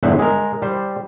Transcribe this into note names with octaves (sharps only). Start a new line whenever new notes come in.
G1 E2 G2 C5 E5 F#5
G#3 A#4
G3 C5